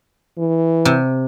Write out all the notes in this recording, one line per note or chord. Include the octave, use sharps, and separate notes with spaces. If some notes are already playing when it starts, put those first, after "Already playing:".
E3
C3